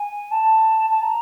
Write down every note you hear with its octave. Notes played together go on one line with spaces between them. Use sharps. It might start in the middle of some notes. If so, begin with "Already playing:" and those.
Already playing: G#5
A5
A5
A#5